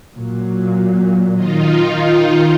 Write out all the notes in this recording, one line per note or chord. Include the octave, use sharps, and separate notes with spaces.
A#2 F#3
D#3 D#4 F4